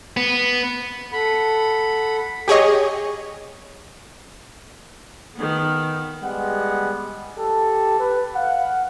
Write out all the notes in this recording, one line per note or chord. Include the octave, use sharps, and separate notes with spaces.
B3
A4 F#5 B5
G4 G#4 C#5 D#5
D#3 B3
G3 G#3 B3 F#5
G4 A4
B4
F5 F#5